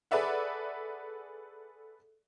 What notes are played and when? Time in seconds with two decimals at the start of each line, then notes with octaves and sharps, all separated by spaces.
0.11 G#4 A4 B4 D5 E5 F#5